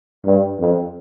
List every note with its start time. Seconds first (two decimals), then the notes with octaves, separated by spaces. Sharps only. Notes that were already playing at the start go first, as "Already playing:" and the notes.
0.25 G2
0.60 F2